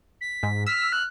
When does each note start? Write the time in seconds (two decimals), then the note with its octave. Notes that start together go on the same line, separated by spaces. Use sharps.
0.21 B6
0.43 G#2
0.67 E6 F6 B6
0.92 F#6